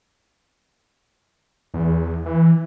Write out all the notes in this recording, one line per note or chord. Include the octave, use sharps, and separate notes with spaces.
E2
E3